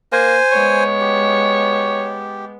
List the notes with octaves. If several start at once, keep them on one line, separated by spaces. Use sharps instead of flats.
A#3 C5 G#5
G#3 B3 C#5
G4